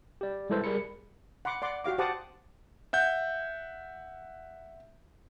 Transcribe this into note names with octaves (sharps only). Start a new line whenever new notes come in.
G4 D5
G3 G#3 E4 A4 B4 C5
G3 G#4 A#4 B5 C#7
F#5 B5 C6 D6
D5 F#5 C6 D6
F#4 G4 F5 D6
G4 C5 F#5 A5 D6 D#6
E5 F#5 G6